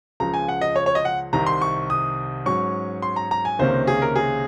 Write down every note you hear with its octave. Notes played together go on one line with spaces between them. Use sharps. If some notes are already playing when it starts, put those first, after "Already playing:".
C#2 C#3 F3 A#5
G#5
F#5
D#5
C#5
C#5
D#5
F#5
C2 C3 D#3 A#5
C6
C#6
D#6
G#2 F#3 C#4 C#6
C6
A#5
A#5
G#5
C#2 C3 D#3 A#3 C#4 C5
G#4
A#4
G#4